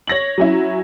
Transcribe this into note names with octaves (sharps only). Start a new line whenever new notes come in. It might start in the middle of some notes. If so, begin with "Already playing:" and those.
C#5 A#6 F#7
F#3 C#4 E4